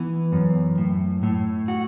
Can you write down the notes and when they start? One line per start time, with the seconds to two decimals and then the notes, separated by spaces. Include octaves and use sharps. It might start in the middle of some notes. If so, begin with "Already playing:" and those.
Already playing: E3 B3
0.32 F#2
0.78 A2
1.23 A2
1.68 F#4